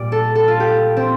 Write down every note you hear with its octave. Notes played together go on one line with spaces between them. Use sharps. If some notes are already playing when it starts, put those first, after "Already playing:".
Already playing: A#2 G3 D5
A4
A4
F4
G4
C4